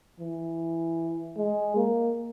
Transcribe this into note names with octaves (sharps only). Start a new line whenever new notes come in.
E3
G#3
A#3